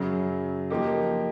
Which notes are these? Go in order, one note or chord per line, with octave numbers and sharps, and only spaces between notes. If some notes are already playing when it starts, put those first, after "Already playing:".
Already playing: F#2 C#3 F#3
F3 A#3 D#4 G4